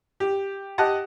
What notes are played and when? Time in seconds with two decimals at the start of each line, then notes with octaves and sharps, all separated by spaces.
0.20 G4
0.78 G4 D#5 F#5 A5